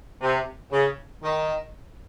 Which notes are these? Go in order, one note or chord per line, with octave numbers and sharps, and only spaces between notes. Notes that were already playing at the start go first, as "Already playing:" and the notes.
C3
C#3
D#3